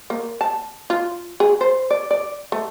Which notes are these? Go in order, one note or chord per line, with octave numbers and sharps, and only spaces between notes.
A#3
A5
F4
G#4
C5
D5
D5
A3